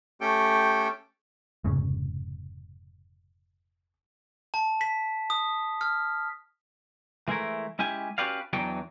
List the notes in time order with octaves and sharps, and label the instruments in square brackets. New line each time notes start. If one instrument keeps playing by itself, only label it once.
[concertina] A3 C#4 G4 A4 G5
[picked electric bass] F1 G#2 C#3
[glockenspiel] A5
B6
D#6
F6
[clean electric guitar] E3 G#3 A3 E4 A#4
G#3 C#4 E4 G4 G#5
C#4 F#4 G4 B4 D5 F5
E2 E3 F#3 D4 D#4 G5